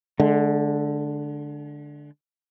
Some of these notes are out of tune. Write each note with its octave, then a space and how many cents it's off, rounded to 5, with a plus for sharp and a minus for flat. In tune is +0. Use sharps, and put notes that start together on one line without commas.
D3 +0 G#3 +40